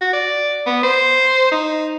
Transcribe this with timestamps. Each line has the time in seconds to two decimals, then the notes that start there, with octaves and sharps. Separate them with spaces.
0.01 F#4
0.13 D5
0.66 B3
0.83 C5
1.52 D#4